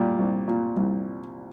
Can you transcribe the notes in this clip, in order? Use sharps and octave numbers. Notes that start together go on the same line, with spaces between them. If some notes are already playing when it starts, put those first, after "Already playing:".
Already playing: A#2 G3
C2
A#2
C2